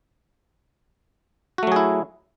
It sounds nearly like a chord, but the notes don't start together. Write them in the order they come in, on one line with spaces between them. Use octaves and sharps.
F#4 A3 F#3 G#4 E4